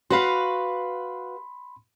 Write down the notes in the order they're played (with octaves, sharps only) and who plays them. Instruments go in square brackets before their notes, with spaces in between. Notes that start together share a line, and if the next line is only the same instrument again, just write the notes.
[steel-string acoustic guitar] F#4 B4 F5 [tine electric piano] B5 C6